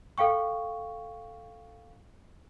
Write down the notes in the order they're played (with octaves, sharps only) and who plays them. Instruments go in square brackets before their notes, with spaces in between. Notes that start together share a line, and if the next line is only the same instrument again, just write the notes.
[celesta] A4 F5 G5 C#6